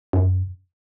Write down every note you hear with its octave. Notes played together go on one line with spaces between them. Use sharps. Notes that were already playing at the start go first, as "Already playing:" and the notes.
F#2